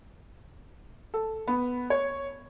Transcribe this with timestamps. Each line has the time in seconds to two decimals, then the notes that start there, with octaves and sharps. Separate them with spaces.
1.14 A4
1.47 B3
1.90 C#5